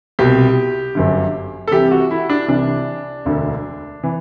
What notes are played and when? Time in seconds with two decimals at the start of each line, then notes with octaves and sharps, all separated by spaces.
0.19 C2 B2 G4
0.95 G1 F#2 D3
1.67 A4
1.72 C2 C3 E3 G4
1.91 F#4
2.11 E4
2.30 D4
2.48 C2 C3 E3 D4
3.25 E1 D2 D3
4.04 E3